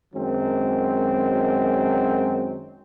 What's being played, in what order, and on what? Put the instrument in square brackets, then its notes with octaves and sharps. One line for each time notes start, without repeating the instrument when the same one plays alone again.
[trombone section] F#2 D#3 F#3 G#3 C4